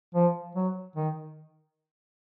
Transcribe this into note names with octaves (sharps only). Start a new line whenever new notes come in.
F3
F#3
D#3